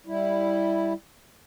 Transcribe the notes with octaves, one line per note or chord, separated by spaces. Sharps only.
G3 E4